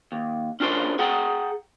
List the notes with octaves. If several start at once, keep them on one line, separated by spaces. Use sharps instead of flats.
D#2
C#4 D4 F4 A#4 C5
G#4 F#5 G5 A#5